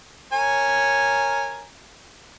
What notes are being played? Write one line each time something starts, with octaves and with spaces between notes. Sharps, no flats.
A#4 C#5 G#5